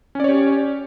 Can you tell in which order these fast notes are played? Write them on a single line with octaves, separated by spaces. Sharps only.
C#4 D5 C#5 G4